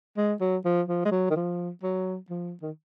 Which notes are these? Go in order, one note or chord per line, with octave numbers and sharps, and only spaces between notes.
G#3
F#3
F3
F3
G#3
F#3
D#3
F3
F#3
F3
D#3